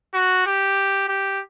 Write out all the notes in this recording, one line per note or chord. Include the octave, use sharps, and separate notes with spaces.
F#4
G4
G4